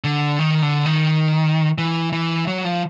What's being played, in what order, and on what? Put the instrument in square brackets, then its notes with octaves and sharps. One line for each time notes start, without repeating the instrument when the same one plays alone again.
[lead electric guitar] D3
D#3
D3
D#3
E3
E3
F#3
F3